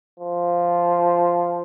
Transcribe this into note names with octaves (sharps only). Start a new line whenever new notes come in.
F3